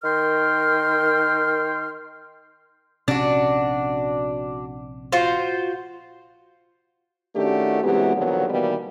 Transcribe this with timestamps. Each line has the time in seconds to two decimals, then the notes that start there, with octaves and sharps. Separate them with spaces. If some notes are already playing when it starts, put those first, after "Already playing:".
0.03 D#3 A#4 G5 C6 F6
3.08 A#1 C3 C#4 D4 F#4
5.12 F4 F#4 C5
7.36 D#3 A3 C#4 D4 F#4 G4
7.83 C3 E3 F#3 G#3 B3 G4
8.15 A#2 D3 D#3 F3 F#3 B3
8.50 B2 D#3 E3 G3 A#3 B3